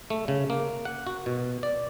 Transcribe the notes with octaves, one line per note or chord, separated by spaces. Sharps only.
A3
C#3
A#3
F#5
F#4
B2
D5